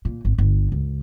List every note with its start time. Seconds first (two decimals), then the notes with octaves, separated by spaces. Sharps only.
0.05 A#2
0.25 G#1
0.38 G1
0.72 C#2